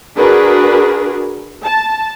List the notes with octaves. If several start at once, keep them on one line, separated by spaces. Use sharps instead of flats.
D4 F#4 G#4 A#4 B4
A5